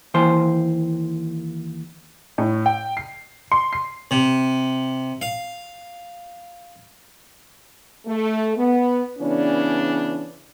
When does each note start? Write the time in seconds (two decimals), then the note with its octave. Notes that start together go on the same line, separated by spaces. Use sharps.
0.14 D#2 E3 C5
2.38 A2
2.66 G5
2.97 C7
3.52 C6
3.73 C7
4.11 C3
5.22 F5
8.06 A3
8.57 B3
9.19 C#3 E3 B3 C#4 D4